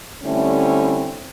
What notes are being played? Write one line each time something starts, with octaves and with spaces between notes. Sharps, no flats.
D3 G3 A3 C4 C#4 E4